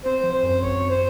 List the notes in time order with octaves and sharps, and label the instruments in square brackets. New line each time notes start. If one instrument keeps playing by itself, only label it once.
[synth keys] C4 [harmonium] C5
[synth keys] F3
[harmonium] C5
[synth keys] F#2
[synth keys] G#1 [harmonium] C#5
[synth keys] C4
[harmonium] C5